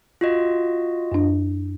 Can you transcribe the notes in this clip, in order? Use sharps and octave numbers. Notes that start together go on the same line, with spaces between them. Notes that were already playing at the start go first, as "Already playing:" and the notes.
F4 F#4 D#5
F#2 D4